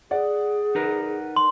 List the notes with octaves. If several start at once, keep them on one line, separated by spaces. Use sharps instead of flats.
G#4 D5 F#5
D#4 A#4 B4
C6